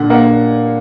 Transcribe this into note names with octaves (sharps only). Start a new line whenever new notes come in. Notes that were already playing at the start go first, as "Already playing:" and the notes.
Already playing: A#2 D3 F#5
A#3 F#5